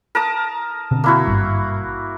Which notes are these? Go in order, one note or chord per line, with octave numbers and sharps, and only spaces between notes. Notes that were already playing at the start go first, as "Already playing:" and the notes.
A#4 A5 D#6
B2 D3 C4
A#3 E4 F#4
G#1 G2